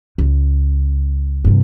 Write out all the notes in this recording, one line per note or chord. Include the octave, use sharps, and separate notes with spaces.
C#2
G2 C3